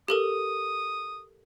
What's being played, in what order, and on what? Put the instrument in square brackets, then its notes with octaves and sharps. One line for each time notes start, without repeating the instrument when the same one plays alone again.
[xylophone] G4 A4 A#4 [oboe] D#6